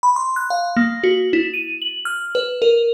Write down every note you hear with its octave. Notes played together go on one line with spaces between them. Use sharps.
B5
C6
F#6
F5
A#3
F#4
E4
D#7
F#7
F6
B4
A#4